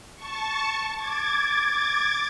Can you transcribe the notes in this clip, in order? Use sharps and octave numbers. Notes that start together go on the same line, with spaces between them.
A5 C#6
D6 G#6 A6